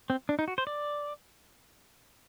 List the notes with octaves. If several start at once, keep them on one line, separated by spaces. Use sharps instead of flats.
C4
D4
D#4
F#4
C5
D5